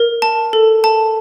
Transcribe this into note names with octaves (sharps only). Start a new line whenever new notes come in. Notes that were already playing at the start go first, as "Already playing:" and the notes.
Already playing: A#4
A5
A4
A5